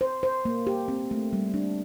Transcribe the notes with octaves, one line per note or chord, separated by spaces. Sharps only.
C5
C5
A#3
G4
C4
A3
G3
D4